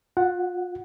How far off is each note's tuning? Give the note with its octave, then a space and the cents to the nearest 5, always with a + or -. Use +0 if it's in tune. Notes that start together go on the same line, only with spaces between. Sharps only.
F4 +35 F#5 +0